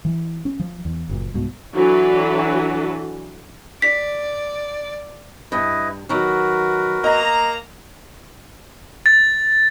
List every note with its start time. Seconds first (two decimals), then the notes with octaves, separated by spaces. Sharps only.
0.05 E3
0.45 C#4
0.60 F3
0.85 E2
1.09 F#1 A#2
1.34 C2 G#2 B2
1.74 E3 F#3 D4 F#4 A4 B4
3.82 D5 B6
5.52 G2 E4 B4 D#5
6.09 D#3 F#3 F#4 A#4 B4
7.04 A#3 D#5 A#5
9.06 A6